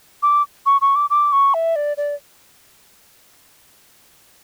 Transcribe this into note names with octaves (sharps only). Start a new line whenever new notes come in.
D6
C#6
C#6
D6
D6
C#6
E5
D5
D5